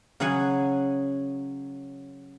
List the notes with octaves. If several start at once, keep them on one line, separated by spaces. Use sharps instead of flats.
C#3 F#3 G#4 F#5 G#5